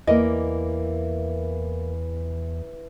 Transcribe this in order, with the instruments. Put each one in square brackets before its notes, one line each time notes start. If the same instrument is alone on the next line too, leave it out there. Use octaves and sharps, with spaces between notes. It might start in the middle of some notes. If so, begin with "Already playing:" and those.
[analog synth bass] E2 [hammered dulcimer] E3 [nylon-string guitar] A#3 A#4 D5 [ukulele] D#5